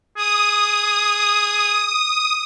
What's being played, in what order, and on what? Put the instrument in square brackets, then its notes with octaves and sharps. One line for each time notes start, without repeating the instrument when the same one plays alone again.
[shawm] G#4 [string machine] D#6